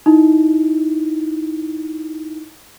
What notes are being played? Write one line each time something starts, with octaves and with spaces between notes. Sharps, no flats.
D#4 E4